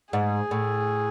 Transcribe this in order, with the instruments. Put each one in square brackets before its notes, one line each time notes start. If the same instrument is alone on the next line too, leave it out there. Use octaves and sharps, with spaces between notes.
[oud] G#2 [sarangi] G#4
[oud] A2